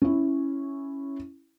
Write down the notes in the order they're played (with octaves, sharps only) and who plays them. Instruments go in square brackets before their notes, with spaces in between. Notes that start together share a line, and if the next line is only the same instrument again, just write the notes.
[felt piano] C#4 E4